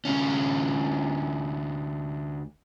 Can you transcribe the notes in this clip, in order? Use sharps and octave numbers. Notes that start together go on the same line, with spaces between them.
D2 C#4